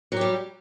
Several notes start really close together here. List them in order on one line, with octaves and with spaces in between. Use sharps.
F#3 G4 G3